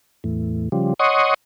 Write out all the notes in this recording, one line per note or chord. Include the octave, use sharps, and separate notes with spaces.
E2 A2
C#3 F3 G3
C#5 D#5 F#5 C6 C#6 D#6